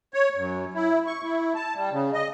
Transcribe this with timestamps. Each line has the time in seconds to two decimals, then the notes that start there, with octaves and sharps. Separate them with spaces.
0.14 C#5
0.36 F#2
0.74 E4
1.07 C#6
1.24 E4
1.55 A5
1.75 G3
1.91 C#3
2.13 D#5